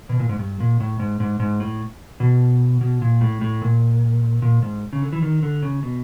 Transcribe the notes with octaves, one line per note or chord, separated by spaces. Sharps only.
B2
A#2
G#2
G2
A#2
A2
G#2
G#2
G#2
A2
B2
B2
A#2
A2
A2
A#2
A#2
G#2
C#3
D3
E3
D#3
D3
C#3
B2